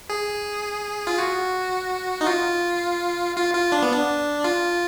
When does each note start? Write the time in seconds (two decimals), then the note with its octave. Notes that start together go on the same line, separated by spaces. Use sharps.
0.09 G#4
1.07 F4
1.18 F#4
2.21 D#4
2.26 F4
3.36 F4
3.54 F4
3.72 D4
3.82 B3
3.93 D4
4.44 F4